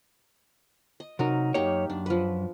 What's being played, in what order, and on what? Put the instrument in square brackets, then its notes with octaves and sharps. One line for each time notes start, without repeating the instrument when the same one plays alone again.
[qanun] D#5
[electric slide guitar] C3 D#4 [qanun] F#3 A#4
[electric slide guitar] F#2 C#5 [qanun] A#3 D#4 G4
[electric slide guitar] F#2 [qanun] D4
[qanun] F3 B4